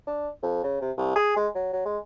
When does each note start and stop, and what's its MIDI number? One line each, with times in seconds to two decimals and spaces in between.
0.07 0.28 62
0.42 0.63 41
0.63 0.77 49
0.81 0.91 48
0.97 1.13 36
1.15 1.32 68
1.36 1.48 56
1.55 1.69 54
1.73 1.84 54
1.85 1.98 56